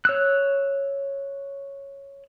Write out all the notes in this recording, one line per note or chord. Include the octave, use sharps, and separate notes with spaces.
C#5 E6 F#6